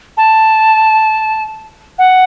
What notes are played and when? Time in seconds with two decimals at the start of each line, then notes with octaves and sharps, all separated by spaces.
0.17 A5
1.98 F#5